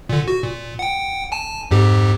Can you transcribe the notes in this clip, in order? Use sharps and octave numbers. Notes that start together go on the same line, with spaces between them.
A#2 D3
F#4
A#2
F#5 G5
G#5 A5
F2 G#2 G4